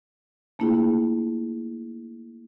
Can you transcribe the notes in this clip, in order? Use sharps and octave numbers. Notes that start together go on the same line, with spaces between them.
A3 A#3 D4 E4 F4 G#4